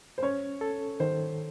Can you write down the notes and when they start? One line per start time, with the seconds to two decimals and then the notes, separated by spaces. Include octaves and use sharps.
0.18 C5
0.23 C#4 C#5
0.61 A4
1.00 D#3 C5